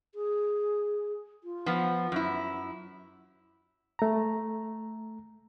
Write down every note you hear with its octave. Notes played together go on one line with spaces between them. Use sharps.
G#4
F4
F3 B3
F#2 E4
A3 A#5